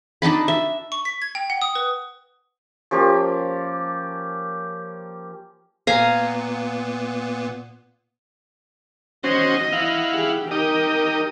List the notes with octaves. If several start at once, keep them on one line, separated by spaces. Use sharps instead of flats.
D4 D#4 A5 B5
E5
C#6
B6
G#6
G5
F#5
D#6
B4
F3 A#3 C#4 G4
A#2 B3 F5 G#5 A#5
C#4 F#4 C5 D#5
E4 F5 F#5
G4 G#4
D#4 G4 A#4 D#5